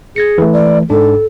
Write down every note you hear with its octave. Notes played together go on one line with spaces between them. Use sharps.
G#4 G#6 A#6 C#7
E3 A3
D5
G#2 D4 A4